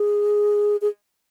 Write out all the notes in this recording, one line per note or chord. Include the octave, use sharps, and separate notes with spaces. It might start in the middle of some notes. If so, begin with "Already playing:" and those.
Already playing: G#4
G#4